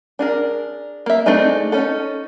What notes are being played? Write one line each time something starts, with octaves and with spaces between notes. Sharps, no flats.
D4 G#4 A#4
A#3 E5
A3 C4 D4 D#4 G#4
C#4 D#4 A4